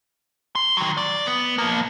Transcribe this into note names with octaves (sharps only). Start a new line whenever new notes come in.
C6
D#3 F#3
D5
B3
F3 A#3